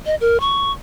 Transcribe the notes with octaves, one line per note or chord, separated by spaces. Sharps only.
D#5
A#4
C#6